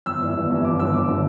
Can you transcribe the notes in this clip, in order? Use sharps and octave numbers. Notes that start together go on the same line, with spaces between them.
G1 E6
G2 E3
G1
G2 E3
G1 D6
G2 D3 E6
G1 D6
D3